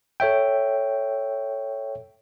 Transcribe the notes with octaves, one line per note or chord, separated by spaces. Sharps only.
A4 C#5 E5 G5